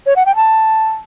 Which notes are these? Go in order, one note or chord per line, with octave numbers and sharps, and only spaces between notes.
C#5
F#5
G5
A5